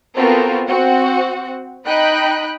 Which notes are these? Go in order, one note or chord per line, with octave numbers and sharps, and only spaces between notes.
B3 C4 F4 F#4 A4 A#4
C4 F#4 F#5
D#4 D#5 G5 B5 F#6